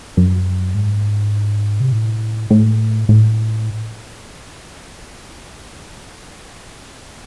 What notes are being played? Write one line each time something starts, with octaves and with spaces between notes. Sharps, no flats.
F#2
G#2
C3
A2
A2
A2